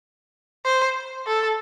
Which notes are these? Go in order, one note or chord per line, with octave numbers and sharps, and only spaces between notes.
C5
A4